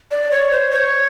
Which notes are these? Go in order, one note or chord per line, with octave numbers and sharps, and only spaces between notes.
D5
C#5
C5
C#5